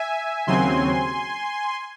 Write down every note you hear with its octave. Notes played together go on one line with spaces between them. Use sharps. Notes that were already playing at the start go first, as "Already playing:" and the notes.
Already playing: E5 G#5
D#2 C#3 F#3 C4 G#5 C6